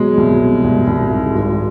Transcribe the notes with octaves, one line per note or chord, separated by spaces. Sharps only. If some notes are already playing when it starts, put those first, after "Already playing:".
Already playing: B2 F#3 G#3
C2
B2
C2
C2
G#2
G#1